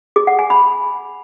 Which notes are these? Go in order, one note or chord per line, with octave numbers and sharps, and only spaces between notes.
G#4
F#5
G#5
B5